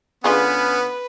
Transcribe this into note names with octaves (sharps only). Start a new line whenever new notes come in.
D3 B3 C#4 F4 G#4 B4